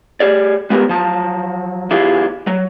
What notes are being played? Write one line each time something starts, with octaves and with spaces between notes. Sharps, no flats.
G4 G#4 D5
G#3 B3 F#4 G4 A#4
F3 F#3 A5
E2 E3 E4 F4 G4 G#4
F#3